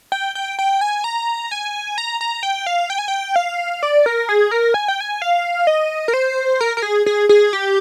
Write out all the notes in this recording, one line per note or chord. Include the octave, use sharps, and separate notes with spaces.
G5
G5
G5
G#5
A#5
G#5
A#5
A#5
G5
F5
G5
G#5
G5
F5
D5
A#4
G#4
A#4
G#5
G5
G#5
F5
D#5
A#4
C5
A#4
A#4
G#4
G#4
G#4
G4